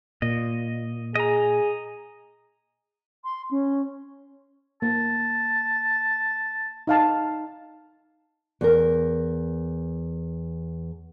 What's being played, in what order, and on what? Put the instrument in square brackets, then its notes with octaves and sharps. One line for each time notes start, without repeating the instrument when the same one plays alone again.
[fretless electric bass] A#2 [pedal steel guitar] D#5
[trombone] G#4 [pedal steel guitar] D#5 A#5
[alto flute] C6
C#4
[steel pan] A#3 [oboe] A5
[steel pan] D#4 F5 A5
[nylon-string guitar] E2 A#4